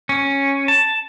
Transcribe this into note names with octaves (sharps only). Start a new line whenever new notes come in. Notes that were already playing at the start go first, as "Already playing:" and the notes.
C#4
A5